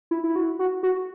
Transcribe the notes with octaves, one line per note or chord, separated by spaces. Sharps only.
E4
E4
F#4
F#4
F#4